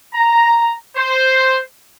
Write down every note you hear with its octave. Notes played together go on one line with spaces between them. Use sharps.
A#5
C5